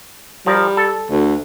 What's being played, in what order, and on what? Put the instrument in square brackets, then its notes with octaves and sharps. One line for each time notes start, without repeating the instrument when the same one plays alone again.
[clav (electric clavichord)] F3 A#4 [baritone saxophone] G3
[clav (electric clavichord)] A4
[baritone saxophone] D2